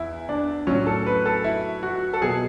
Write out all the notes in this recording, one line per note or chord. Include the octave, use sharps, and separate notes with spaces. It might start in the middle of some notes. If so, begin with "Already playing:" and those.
Already playing: E2 E4
D4
A2 F#3 C#4
A4
B4
A4
E4
F#4
A4
B2 F#3 G#4